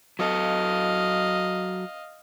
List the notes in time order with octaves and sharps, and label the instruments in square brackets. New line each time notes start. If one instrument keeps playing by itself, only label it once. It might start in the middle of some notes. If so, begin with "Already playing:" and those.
[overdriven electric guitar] F#3 A4 [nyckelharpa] D#5 F5